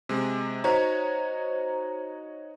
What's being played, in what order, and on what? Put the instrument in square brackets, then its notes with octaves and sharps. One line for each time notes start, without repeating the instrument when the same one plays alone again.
[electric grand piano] C3 G#3
[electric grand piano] D#4 F#4 C#5 [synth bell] C5 A#5